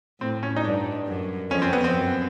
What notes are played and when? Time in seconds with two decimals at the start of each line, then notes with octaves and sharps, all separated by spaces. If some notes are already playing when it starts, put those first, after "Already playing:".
0.21 A2 C4
0.43 C#4
0.56 D#4
0.65 G2 D4
1.07 F#2
1.50 F2 C#4
1.62 C4
1.73 B3
1.84 C4
1.94 F#2